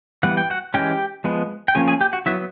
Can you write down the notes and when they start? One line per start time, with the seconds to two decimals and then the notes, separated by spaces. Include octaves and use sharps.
0.23 E3 G3 B3 F#5
0.37 G5
0.50 F#4 F#5
0.74 E3 G#3 C#4 G4 G5
1.24 F3 G#3 B3
1.68 G5
1.75 F3 A#3 C#4 G#4 G#5
1.88 G#4 G#5
2.01 G4 G5
2.13 F#4 F#5
2.26 F#3 B3 E4 E5